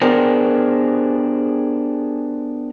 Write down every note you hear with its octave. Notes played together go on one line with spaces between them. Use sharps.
B3 D4 G4 G#4 A#4 C5